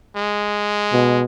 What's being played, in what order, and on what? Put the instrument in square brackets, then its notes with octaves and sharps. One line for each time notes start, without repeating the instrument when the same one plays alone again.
[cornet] G#3
[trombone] B2